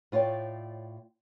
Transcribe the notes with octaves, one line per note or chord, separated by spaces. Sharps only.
A2 F4 C#5 D5 G5